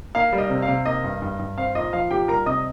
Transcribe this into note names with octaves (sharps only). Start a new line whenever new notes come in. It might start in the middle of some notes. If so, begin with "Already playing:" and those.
A#3 F5
G3
D#5
C3
F5
C3
A#3 D#5
G2
G2
G2
C4 F5
A#2 D#5
F3 F5
A#2 G4 G5
G3 A#4 A#5
C3 D#5 D#6